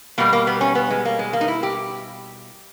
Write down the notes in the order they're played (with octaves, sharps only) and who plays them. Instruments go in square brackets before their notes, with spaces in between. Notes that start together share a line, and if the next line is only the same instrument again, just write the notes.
[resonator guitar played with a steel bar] B2 G3 A#3
A#3
B3
C#4
B3
G#3
A#3
G#3
A#3
D#4
E4
G4